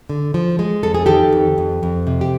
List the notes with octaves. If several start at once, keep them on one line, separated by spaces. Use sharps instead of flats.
D3
F3
G#3
F2 A4
G#4
D#3 G4 A4
F2
F2
F2
C3
G4